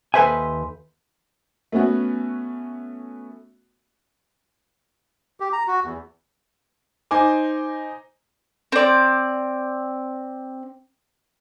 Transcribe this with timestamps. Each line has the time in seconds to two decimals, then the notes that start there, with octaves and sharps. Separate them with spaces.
0.14 D#2 A4 B4 C5 E5 G#5
1.72 A3 B3 C#4 F#4
5.40 G4
5.53 A#5
5.68 F#4
5.84 E2
7.11 D#4 C5 G#5 D6
8.72 C4 D5